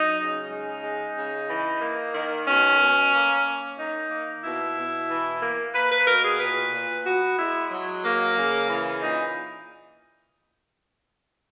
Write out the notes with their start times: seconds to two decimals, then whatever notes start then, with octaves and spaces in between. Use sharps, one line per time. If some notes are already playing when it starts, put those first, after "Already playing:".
Already playing: F#3 D#4
0.19 C#3
0.51 G#3 D#4
0.84 G#3
1.16 C#3
1.49 E3
1.82 A#3
2.15 D#3
2.47 B2 C#4
2.80 B2
3.13 A#3
3.46 A#3
3.78 D#3 D#4
4.11 A#3
4.44 B2 E4
4.77 B2
5.09 E3
5.42 A#3
5.74 A#3 B4
5.92 B4
6.07 B2 A#4
6.24 G#4
6.40 A#2 B4
6.73 A#2
7.05 B3 F#4
7.39 G#3 E4
7.71 F#3
8.05 A#3
8.37 C#3
8.70 E3
9.02 A#2 D#4